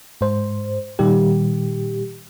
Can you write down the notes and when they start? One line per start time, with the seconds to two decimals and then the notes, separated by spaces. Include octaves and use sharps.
0.21 G#2 C5
0.99 A#2 D#3 G3 G4